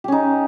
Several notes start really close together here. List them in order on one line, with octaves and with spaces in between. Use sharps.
G4 C#4 D#4